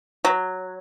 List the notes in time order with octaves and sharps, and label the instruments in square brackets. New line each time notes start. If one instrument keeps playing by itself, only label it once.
[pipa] F#3